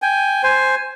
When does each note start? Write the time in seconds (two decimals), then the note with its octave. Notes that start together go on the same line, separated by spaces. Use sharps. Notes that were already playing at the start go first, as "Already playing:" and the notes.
0.02 G5 G#5
0.43 C5 G#5